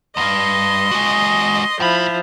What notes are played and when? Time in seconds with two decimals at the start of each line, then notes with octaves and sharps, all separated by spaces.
0.17 D2 G2 D#5 C6
0.91 G#3 F#4
1.80 A2 F3 E4 B5